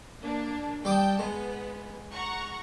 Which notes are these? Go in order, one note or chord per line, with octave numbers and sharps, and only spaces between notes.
A#3 D4
G3 G5 A5 D6 D#6
G#3 B3
F#5 A#5 C#6